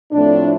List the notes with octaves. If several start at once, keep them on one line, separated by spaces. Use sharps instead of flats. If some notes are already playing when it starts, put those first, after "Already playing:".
A2 F3 A3 C4 D4